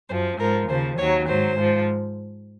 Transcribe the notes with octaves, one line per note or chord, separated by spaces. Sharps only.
F#2 F3 C5
G#2 F3 A#4
D#2 C#3 F3 C5
D#2 D#3 F#3 C#5
G#2 F#3 C5
G#2 F3